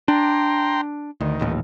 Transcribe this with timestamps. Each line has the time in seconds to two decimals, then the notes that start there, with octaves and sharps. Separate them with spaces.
0.08 D4 G5 A#5 C6
1.21 D2 D#3
1.39 D#1 A1 D#2